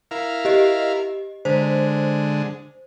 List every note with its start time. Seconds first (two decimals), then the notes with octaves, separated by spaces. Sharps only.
0.11 E4 A#4 F5
0.45 G4 D#5
1.45 D3 G#3 C5